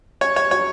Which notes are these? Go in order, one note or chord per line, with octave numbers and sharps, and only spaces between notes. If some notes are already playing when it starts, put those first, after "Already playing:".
C#4 C#5
C#5
F#3 C#5